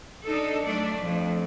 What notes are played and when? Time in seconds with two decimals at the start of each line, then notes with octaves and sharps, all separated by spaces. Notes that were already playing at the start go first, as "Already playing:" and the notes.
0.25 D4 D#4 A4
0.65 F#3 A3 D4 D5
1.02 F2